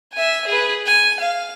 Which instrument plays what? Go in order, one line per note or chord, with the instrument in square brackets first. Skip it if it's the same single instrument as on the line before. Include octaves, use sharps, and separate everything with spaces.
[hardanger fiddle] E5 G#5
G#4 B4
G#5
F5